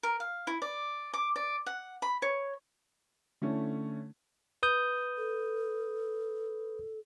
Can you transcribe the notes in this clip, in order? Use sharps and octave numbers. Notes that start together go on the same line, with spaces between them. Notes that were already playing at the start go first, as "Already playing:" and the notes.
A#4
F5
E4
D5
D6
D5
F#5
B5
C#5
D3 A3 C#4 E4
B4 D#6 G6
A4